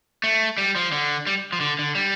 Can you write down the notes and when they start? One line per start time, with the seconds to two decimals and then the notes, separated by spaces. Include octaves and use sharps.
0.24 A3
0.58 G3
0.76 F3
0.92 D3
1.27 G3
1.53 F3
1.61 D3
1.79 D3
1.95 G3